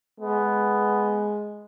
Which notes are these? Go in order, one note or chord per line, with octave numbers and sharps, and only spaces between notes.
G#3 B3